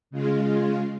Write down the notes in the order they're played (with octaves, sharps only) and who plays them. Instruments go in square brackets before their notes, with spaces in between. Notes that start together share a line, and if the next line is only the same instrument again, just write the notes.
[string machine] C#3 G#3 F4